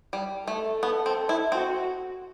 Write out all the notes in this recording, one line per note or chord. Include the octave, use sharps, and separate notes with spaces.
G3
A3 A4
B3
C4
E4
C4 F#4